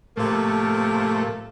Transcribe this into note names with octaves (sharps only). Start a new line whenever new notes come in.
A2 C3 F3 A3 A#3